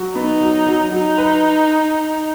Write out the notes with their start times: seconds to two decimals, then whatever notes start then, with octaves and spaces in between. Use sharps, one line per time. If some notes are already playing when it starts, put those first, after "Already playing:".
Already playing: F#3 F#4
0.15 B3 D#4
0.41 F#3
0.67 F#3
0.92 F#3 D#4
1.18 B4